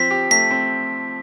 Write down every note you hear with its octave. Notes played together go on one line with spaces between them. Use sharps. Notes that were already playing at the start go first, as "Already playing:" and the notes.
Already playing: F3 C4 B6
G4
A3 B6
C4